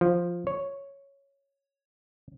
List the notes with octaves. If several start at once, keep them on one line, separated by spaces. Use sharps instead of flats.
F3
C#5